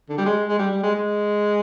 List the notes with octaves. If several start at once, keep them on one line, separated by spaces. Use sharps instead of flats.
D3
G3
G#3
G#3
G3
G3
G#3
G#3